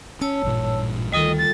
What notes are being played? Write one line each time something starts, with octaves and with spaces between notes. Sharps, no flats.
C#4 C#5 A5 E6
A1 G2 A#2
D2 D#3 G3 F4 A4 D#5
A6